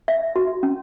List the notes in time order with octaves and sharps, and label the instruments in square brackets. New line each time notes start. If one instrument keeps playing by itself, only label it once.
[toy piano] E5
F#4
C#4